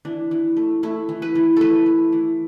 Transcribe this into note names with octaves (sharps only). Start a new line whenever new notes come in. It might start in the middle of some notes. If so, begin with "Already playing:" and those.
E3 D4
E3
A3
A3 E4
E3
B4
E3
A3 A4 B4
A3
E3